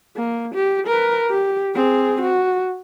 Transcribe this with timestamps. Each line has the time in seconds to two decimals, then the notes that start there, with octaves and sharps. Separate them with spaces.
0.16 A#3
0.54 G4
0.87 A#4 B4
1.30 G4
1.75 C4 G#4
2.21 F#4